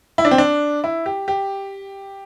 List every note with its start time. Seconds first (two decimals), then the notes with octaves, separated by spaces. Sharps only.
0.18 E4
0.25 D4
0.31 C4
0.38 D4
0.84 E4
1.06 G4
1.28 G4